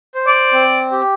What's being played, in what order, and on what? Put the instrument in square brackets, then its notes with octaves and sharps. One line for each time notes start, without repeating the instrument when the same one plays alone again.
[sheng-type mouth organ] C5
[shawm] D5
[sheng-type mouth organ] C4
G4